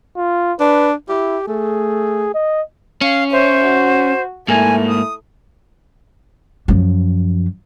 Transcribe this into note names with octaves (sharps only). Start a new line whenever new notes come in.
F4
D4 B4
E4 G4
A3 G#4
D#5
C#4 F5
C5 C#5 E5
F#4
G#2 A3 A#3 E4 G#5
D#6
F#2 F3